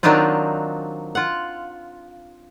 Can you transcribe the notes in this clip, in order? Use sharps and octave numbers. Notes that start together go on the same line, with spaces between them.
D#3 F#3 C4 D4 D#4 F4
F4 F#5